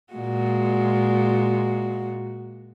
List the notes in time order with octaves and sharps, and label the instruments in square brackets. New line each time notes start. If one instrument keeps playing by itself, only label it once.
[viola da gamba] A#2 G#3 F#4